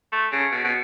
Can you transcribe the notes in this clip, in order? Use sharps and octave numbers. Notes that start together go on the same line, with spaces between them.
A3
C#3
B2
B2